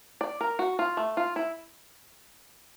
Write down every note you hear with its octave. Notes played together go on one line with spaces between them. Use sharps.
D5
A#4
F#4
F4
A3
F4
E4